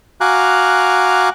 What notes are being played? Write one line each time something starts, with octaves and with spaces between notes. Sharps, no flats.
F#4 F5 G#5 A#5 D6 F#6